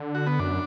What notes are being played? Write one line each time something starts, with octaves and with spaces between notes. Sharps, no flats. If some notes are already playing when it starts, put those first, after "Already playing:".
Already playing: D3
F#4
B3
F#2 D4